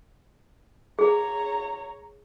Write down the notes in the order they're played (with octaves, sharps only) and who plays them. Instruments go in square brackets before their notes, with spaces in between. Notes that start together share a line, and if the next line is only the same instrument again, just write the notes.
[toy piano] G#4 [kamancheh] C#5 A#5